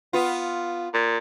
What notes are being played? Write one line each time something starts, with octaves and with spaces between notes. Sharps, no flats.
B3 F4
A#2